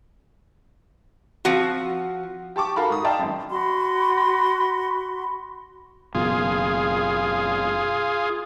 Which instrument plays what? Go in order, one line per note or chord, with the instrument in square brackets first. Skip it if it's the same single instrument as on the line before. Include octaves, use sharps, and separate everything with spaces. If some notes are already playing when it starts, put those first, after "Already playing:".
[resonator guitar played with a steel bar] F3 C4 F#4
[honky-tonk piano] G4 A5 C#6 D6
F#4 A4 A#4 F5 B5 C#6
G#2 D#6
D5 E5 F5 G5 A5 A#5
G#1 F#2
[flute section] F#4 B5 C6
[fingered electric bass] F#1 F#2 B2 [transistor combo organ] F4 G#4